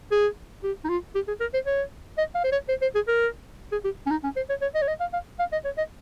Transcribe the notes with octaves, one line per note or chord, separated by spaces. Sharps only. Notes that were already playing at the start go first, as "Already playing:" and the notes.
G#4
G4
D#4
F4
G4
G#4
A#4
C5
C#5
D#5
F5
C5
C#5
C5
C5
G#4
A#4
G#4
G4
C#4
D#4
C#4
C5
C#5
C#5
D#5
C#5
D#5
F5
F5
F5
D#5
C#5
D#5